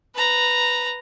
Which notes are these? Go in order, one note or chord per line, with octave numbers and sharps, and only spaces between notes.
B4 A#5